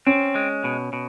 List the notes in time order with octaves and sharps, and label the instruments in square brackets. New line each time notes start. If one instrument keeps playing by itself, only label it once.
[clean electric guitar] C4 [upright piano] C#4
[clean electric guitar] G#3
B2
B2